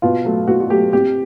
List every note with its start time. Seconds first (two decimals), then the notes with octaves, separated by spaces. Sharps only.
0.02 B2 F4
0.25 F#3 A3
0.48 B2 F#4
0.60 F#4
0.70 F#3 A3 G4
0.93 C3 G4